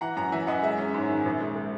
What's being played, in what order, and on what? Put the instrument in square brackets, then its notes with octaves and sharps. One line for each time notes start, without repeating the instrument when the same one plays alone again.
[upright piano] E3 F#5 A#5
F#2 F#5 A#5
E3 E5 G#5
F#2 D#5 F#5
G#3 E5
C#4
G#2
D#3
A#1
G#3
G#3